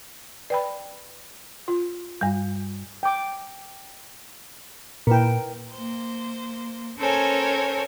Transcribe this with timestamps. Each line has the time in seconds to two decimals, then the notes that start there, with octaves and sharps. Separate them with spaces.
0.50 B4 D5 G5 B5
1.68 F4
2.21 G2 G3
3.03 G5 D6
5.07 A#2 E4 A#4 B4 G5
5.73 A#3 C5
6.97 C#4 A4 A#4 C5 C#5 G#5